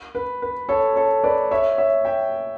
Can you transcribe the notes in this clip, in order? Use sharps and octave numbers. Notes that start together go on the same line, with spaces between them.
B4
B4
A4 C#5
A4 C#5
B4 D5
C#5 E5
C#5 E5
E5 G5